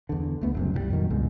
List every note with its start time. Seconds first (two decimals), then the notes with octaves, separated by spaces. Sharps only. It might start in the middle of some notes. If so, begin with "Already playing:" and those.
0.09 E2 D3
0.41 C#2 A3 B3
0.55 F#1 C2 F#2
0.74 C2 F3 G3
0.90 F2 A#2 D#3 F#3
1.10 C#2 G2 B2 G#3